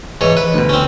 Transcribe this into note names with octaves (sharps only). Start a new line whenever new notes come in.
G#2 E3 C#5
B4
D2 B2
C4 C#4